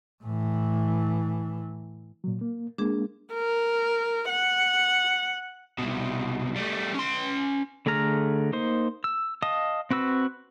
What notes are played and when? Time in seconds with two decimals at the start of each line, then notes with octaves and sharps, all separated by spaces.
0.24 A2 E3
2.24 A#2 F#3
2.41 A#3
2.78 G#3 A#3 D4 G#4
3.33 A#4
4.29 F#5
5.79 C2 B2
6.56 G3 A3
6.94 C#4 C6
7.86 D3 A3 G#4 A#5 F6
8.53 A#3 D#4 C5
9.04 E6
9.42 D#5 F5 A5 D#6
9.91 C4 F#4 B4 E6